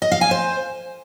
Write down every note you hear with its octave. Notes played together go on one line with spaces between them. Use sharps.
D#5
F5
G#5
C5